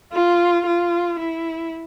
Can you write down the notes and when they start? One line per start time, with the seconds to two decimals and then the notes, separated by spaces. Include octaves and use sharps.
0.13 F4
0.66 F4
1.19 E4